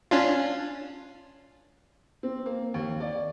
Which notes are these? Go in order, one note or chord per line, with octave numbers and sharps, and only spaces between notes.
C#4 D4 F4
C4
A#3
D#2
D5